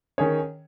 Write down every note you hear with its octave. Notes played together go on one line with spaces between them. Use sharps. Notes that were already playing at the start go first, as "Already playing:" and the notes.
D#3 C#4 G#4 C#5